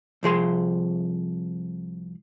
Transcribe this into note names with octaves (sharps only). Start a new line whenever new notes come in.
C2 F3 G#4 C6